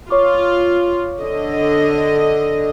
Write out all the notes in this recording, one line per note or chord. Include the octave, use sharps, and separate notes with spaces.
F4 C#5 C#6 D6
D3 D#5